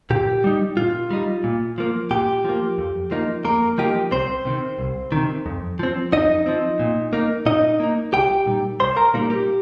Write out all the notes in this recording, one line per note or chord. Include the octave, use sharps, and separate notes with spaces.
A#2 G4
G3 D#4
A#2 F4
G3 D#4
A#2
F3 A#3
A#2 G4
F3 A#3
F2
F3 A#3 D#4
F2 A#3 A#4
F3 A#3 D#4 G4
C2 C4 C5
C3 D#3
C2
C3 D#3
F2
F3 C4
F2 D#4 D#5
F3 C4
A#2
A#3 D#4
A#2 D#4 D#5
A#3 D#4
C2 G4 G5
A#2 G3 D#4
C2 C5 C6
A#4 A#5
A#2 G3 A#3 D#4 A#4
G4